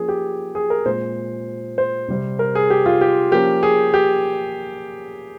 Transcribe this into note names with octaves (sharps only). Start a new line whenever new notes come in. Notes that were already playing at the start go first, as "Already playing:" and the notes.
Already playing: F3 A#3 C#4 G#4
G4
G#4
A#4
A#2 G#3 C4 C5
C5
C3 G3 C4
A#4
G#4
G4
F4
G4
F3 A#3 C#4 G4
G#4
G4